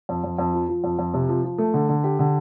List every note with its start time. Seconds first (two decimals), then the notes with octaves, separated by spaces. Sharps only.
0.09 F2
0.24 F2
0.38 F2
0.54 F3
0.69 F3
0.84 F2
0.99 F2
1.14 C3
1.29 F3
1.44 F3
1.58 A3
1.74 D3
1.89 D3
2.04 G4
2.19 D3